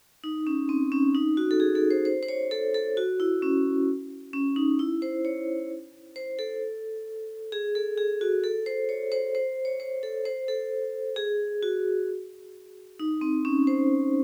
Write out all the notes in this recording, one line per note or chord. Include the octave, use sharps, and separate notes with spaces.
D#4
C#4
C4
C#4
D#4
F#4
A4
G#4
A4
C5
C5
C5
C#5
A4
A4
F#4
E4
C#4
C#4
D#4
E4
C5
C#5
C5
A4
G#4
A4
G#4
F#4
A4
C5
C#5
C5
C5
C#5
C5
A4
C5
A4
G#4
F#4
D#4
C4
C#4
C5